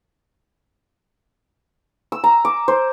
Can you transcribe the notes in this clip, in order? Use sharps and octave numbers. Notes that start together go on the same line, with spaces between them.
E6
A#5
D6
C5